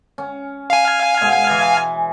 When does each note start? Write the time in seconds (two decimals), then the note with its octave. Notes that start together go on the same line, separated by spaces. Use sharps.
0.18 C#4
0.70 F5 G#5
1.21 B2 G#3
1.50 E3